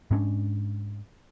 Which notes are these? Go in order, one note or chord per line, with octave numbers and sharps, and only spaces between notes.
G#2 G#3 C#4 D4